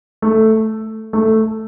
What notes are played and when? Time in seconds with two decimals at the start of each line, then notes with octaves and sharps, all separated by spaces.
0.22 A3
1.13 A3